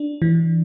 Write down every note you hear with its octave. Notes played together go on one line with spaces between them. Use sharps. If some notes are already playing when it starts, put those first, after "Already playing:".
Already playing: D4
E3